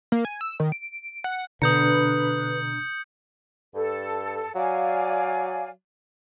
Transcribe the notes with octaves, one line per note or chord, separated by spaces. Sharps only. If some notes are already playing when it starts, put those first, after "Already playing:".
A#3
G#5
E6
D#3
D7
F#5
B2 D3 D4 B4 A#5 D#6 G6 C#7
G2 A4
F#3 D5 F5 G#5